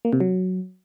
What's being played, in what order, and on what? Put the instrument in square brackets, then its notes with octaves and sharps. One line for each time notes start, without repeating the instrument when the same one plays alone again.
[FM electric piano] A#3
C3
F#3